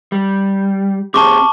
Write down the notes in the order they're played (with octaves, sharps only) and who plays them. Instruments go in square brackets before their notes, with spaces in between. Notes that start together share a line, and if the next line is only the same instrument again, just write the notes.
[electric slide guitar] G3
[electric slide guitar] C4 G4 G#4 [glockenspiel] A5 C#6 D6